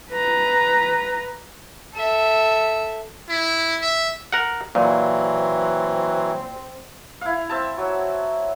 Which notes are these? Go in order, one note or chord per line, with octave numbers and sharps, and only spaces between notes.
B4 A#5
A4 E5
E4
E5
A#4 F#5
A#2 E3 F#3 C4
E4 F5
C4 E5 A5
F#3